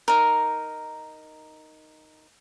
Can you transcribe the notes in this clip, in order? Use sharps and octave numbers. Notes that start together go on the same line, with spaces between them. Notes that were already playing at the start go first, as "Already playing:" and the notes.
D#4 A#4